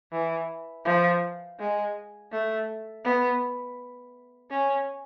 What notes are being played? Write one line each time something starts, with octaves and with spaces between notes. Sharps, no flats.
E3
F3
G#3
A3
B3
C#4